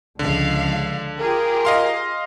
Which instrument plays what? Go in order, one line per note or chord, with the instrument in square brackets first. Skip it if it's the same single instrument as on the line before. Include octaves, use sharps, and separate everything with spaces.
[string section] C#2 F3 F5 [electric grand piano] D3
[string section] F4 G4 G#4 [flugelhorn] A#4
[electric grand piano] D#5 F5 C6